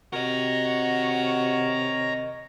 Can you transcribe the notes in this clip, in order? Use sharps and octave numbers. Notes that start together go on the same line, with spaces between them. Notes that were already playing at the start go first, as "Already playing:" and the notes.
C3 F#4 A#4 C#5 D#5 A#5